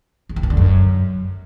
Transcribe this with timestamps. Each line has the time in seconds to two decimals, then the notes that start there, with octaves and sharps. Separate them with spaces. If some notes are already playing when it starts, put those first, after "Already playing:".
0.29 E2
0.36 D3
0.43 B2
0.50 D3
0.57 F#2